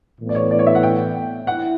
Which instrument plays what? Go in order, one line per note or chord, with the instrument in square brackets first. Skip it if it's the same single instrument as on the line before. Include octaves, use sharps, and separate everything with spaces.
[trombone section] A2 E3 B3
[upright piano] D5
C#5
D5
C#5
E5
F#5
G5
[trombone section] E4 [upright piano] F#5